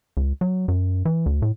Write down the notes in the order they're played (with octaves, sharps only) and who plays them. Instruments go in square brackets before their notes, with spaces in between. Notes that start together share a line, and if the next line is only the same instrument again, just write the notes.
[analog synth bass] C#2
F#3
F#2
E3
D2
A2